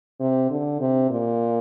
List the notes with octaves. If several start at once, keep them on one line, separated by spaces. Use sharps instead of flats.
C3
D3
C3
A#2